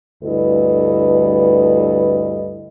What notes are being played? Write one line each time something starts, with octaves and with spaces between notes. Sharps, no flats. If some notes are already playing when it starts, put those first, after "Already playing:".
D2 G2 E4 A4 B4 D#5